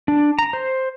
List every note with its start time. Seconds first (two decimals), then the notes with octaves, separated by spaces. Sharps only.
0.08 D4
0.39 A#5
0.53 C5